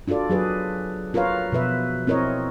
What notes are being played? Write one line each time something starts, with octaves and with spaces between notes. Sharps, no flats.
D4 F4 F#4 A4 D5
F#3 G#4 B4
F4 A#4 B4 C#5 F5
B2 F3 B4 E5
C4 E4 A#4 C#5 D#5